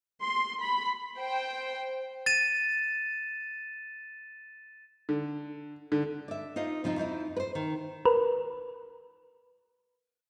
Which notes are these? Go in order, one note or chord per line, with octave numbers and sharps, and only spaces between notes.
C6
B5
C5 G5
A6 D#7 E7
D3
D3
D5 E5
D#4 F4 C5 D#5
C#3 F3 C4 D#4
F2 F3 D#4 E4
B4 C5
D#3
A#4 B4